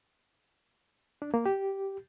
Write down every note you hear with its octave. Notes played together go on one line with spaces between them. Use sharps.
D4
A#3
G4